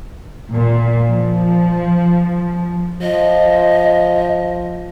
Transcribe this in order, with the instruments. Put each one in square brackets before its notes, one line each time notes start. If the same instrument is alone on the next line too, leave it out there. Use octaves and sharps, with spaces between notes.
[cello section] A#2
F3
[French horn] F3 [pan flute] D#5